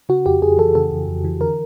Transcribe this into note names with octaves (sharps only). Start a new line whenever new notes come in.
C#3 F#4
F2 G4
F2 G#4
E3 A4
C#3 A4
F2
F2
E3
D3 A#4